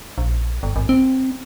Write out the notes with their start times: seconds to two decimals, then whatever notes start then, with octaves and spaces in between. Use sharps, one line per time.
0.18 A#1
0.63 G1
0.76 G#1
0.89 C4